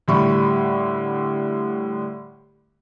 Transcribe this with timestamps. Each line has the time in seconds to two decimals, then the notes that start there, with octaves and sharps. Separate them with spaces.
0.08 A2 D3 G3 B5 C#6